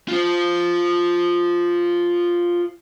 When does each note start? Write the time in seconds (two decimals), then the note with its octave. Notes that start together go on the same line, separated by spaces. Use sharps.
0.08 F4 C5